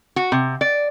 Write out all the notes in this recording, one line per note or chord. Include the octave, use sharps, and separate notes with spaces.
F#4
C3
D5